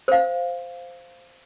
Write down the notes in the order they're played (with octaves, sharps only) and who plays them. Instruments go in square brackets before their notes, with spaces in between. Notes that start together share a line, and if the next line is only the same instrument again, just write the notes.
[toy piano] C5 F5